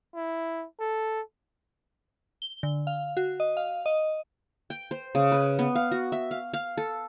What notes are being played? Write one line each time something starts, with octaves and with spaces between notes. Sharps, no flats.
E4
A4
G7
D3
F5
F#4
D#5
F5
D#5
G5
C5
C#3
B4
B3
F5
F#4
E5
F5
F5
A4